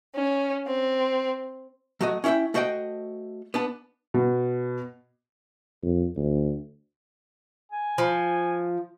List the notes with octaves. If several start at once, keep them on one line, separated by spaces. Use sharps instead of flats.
C#4
C4
F#3 A3 F#4 D#5
C#4 E4 C#5 E5 G5
A3 F#4 C5 D#5 F#5 G5
B3 D4 A5
B2
F2
D2
G#5
F3